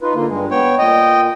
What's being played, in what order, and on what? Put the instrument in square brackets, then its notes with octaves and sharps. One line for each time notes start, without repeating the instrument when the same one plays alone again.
[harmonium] D#4 F4 B4
D3 A#3 F4
G2 G#3
[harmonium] B3 [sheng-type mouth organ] C#5 G5
[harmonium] A#2 [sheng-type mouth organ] D#5 G5